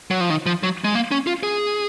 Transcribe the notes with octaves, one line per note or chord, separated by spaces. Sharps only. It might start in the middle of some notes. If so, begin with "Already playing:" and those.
F#3
F3
D#3
F3
F#3
G#3
A#3
C#4
F4
G#4